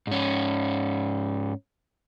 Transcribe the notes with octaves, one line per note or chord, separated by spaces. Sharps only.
G#2 C#4